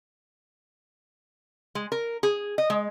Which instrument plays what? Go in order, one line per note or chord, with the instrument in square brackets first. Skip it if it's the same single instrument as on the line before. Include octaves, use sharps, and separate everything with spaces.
[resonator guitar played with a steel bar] G#3
A#4
G#4
D#5
G#3